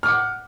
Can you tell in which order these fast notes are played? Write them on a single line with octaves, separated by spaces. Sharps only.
F6 D6 F#5